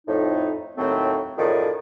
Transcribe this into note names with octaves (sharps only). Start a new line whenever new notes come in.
F2 A2 D#4
D#2 A2 F#3 A3 C4
F#2 A2 D#3 F3 G#4 D5